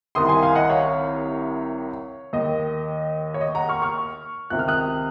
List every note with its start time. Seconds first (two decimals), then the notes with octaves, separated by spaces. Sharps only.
0.15 C2 C3 D#3 C6 D#6
0.28 G#5 C6
0.42 F5 G#5
0.56 D#5 F#5
0.70 C#5 F5
2.33 D#2 D#3 D#5
3.34 C#5
3.41 D#5
3.55 F#5 A#5
3.69 C#6 F6
3.82 C#6 F6
4.50 C#2 C3 D#3 F#6
4.59 F6
4.68 D#6 F#6